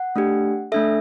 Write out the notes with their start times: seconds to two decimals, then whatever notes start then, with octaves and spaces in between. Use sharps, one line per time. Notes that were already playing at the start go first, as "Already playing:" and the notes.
Already playing: F#5
0.16 A3 D4 G4
0.72 A3 D4 A4 E5